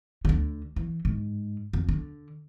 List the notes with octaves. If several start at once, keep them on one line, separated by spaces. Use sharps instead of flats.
D2 D3
E3
G#2
F2
D3